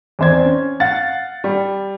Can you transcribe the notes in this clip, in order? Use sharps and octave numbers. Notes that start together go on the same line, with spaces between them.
E2 C4 C5 D5 G#6
C#4
F5 F#5 A6
G3